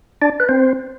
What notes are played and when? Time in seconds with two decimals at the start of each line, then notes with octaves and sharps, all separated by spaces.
0.22 D4 D5
0.40 B4
0.49 C4 C5